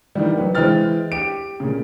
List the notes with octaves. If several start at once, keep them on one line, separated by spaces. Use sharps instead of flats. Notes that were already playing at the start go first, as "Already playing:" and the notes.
D#3 E3 G3
F#3 B4
E3 G#3 C5 G5 F6 A6
G4 D7
A#2 C#3